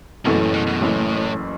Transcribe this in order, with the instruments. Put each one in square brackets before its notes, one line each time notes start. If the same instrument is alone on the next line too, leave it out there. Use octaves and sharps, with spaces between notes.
[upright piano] F#1 F#2 E3 A3 [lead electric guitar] B2
[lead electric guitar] A2
B2
B2
[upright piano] F#1 F#2 E3 A3 [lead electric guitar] A2